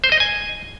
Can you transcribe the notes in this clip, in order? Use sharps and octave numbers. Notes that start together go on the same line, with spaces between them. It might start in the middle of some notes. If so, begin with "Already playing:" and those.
C5
D#5
G#5